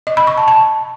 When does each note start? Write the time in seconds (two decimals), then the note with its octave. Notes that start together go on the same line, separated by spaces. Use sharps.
0.07 D#5
0.17 B5
0.27 C#6
0.37 A5
0.48 A5